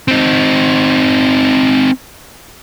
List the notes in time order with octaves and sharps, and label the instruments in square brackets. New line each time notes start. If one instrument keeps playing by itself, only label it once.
[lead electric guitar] C4 D#4